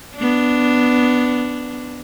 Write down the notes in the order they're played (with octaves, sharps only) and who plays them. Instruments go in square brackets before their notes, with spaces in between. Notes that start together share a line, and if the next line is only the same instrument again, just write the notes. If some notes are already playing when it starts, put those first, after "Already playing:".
[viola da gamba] B3 D4